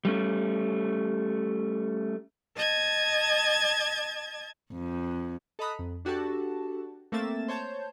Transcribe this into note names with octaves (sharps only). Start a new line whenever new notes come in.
G3 A3 C#4
D#5 A5 G#6 A6
F2
A4 D#5 A#5 B5 D#6 F#6
F2
D4 F#4 G4 A4 A5
A3 A#3 C4 E5 A6 E7
C5 C#5 A5 G6